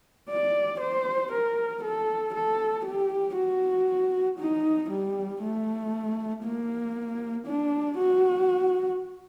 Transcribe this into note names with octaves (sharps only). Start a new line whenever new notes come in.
D5
C5
A#4
A4
A4
G4
F#4
D#4
G3
A3
A#3
D4
F#4